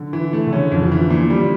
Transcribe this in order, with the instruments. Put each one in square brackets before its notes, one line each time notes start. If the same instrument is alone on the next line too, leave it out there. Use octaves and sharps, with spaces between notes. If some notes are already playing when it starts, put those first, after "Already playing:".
Already playing: [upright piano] D3
[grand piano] E3
A3
[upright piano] D3
[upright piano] C#3 E3 [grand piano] C#4
[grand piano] F2
[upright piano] D3 F3
[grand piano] E3
A#2
G3